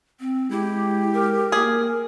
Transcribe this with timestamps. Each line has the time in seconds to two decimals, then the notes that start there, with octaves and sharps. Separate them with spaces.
0.20 C4
0.51 G#3 E4 G4
1.14 A#4
1.52 A#3 G#4